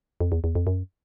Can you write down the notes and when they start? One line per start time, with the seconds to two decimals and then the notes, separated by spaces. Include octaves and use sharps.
0.20 F2
0.32 E2
0.44 E2
0.55 F2
0.67 F#2